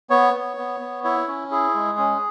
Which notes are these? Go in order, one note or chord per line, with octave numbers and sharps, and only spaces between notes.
B3 C#5
B3
B3
B3
E4 C#5
C#4
E4 G#4
G#3
C#4